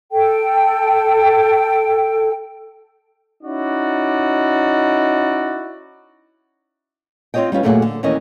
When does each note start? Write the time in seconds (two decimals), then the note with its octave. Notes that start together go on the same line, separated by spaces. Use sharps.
0.12 A4 G5
3.43 C#4 D#4 E4 F#4 D5
7.34 C4 F4 G4 C#5 D#5 G5
7.52 G3 C#4 F4 B4
7.63 F#2 A#2 A3 A#3 F#4 G#4
7.82 D3
8.03 D#2 E3 C#4 A#4 D#5